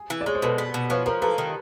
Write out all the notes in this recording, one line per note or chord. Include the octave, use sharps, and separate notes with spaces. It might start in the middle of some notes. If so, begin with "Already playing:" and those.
Already playing: G#4
E3
D5
G#3 C#5
C5
B2 A4 B4
B3
B2
F3 B4 C#5
F3 A#4 C5
A#3 A4 B4
D#3